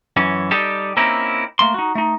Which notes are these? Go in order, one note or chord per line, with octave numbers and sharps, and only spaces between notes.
F#2 E3 C#4
G3 D#4 G4 A4
A#3 C4 C#4 D#4 E4
A3 A#3 C6
D#4 F#4
A3 D#4